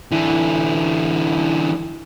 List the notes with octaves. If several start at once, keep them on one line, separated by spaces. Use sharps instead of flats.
D3 E3